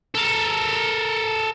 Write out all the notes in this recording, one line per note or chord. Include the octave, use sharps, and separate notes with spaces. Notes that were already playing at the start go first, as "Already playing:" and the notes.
A4 A#4